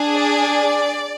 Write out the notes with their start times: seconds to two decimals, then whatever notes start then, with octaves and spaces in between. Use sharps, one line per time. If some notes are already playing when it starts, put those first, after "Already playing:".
Already playing: D4 G#4
0.17 D5